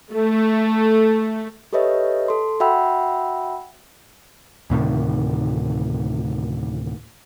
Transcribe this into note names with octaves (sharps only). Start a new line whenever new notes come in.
A3
G4 A4 B4 C#5 D#5 E5
A4 C6
F#4 E5 F#5 G5 B5 E6
D2 A2 C3 D#3